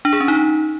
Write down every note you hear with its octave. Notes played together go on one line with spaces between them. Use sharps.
D4
G#4
C#4
D#4